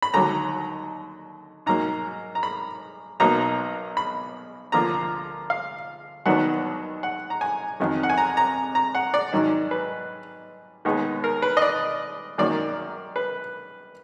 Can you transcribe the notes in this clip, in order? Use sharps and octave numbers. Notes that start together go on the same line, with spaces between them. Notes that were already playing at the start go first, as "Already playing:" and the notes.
B5
D#2 D3 F#3 A#5
G#2 F#3 A#3 A#5
A#5
B5
B1 B2 F#3 A#3 D#4 A#5
B5
D2 D3 F3 A#3 F4 A#5
F5
D#2 D#3 F#3 B3 D4 F#5
F#5
A#5
G#5
F2 D#3 F#3
F#5
G#5
A#5
A#5
A#5
F#5
D5
G#2 D#3 F#3 D4
B4
D#2 D#3 G#3 B3 D#4
A#4
B4
D#5
D5
F#2 D#3 F#3 A#3 D5
B4